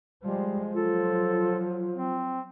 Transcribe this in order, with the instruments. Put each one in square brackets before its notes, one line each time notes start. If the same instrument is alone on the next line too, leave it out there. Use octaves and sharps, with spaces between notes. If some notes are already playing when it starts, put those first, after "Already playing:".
[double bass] F3 G#3 [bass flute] G3
[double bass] F3 F#3 [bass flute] F4 [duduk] A4
[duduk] C4